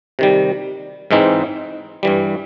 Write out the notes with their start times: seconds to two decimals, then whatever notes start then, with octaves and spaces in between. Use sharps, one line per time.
0.19 C3 D#3 G3
1.11 G#2 E3 G#3 C4 D#4
2.03 G2 E3 G3